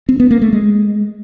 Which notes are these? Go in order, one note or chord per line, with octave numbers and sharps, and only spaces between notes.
C4
B3
A#3
A3
G#3